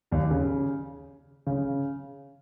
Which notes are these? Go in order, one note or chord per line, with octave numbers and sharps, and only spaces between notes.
D#2 D#3
C#3
C#3